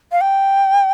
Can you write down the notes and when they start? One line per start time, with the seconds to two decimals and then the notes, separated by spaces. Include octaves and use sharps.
0.12 F5
0.21 G5